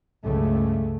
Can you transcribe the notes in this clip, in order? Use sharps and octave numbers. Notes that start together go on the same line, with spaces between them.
C#2 G2 C#3 A3